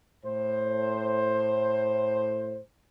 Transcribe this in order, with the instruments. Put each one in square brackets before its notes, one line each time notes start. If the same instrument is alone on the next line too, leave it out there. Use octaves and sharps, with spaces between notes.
[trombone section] A2 C5